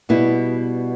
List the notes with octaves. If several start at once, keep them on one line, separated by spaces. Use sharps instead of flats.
B2 G3 B3 E4